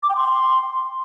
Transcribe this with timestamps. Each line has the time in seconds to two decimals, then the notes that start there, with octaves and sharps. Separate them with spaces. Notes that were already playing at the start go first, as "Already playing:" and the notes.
0.03 D6
0.09 G5
0.16 C6